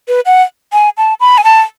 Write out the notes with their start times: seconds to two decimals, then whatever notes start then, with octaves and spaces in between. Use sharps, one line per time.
0.08 B4
0.26 F#5
0.73 G#5
0.97 A5
1.20 B5
1.38 G#5
1.44 A5